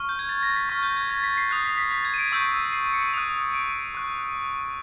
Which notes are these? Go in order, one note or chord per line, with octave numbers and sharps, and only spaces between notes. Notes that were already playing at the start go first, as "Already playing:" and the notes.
Already playing: C#6 F6
G6
G#6
A6
A#6
B6
C#6 F6 A#6
G6
G#6
A6
B6
C7
D#6 F#6 C7
B6
B6
A6
G#6
D#7
D7
C#6 E6 G6
C7
C#7
D#7
D#6 F#6
D7
C#6 F#6